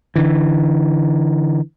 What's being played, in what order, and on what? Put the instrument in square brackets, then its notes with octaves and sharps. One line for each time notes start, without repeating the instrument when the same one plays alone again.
[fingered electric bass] D3 E3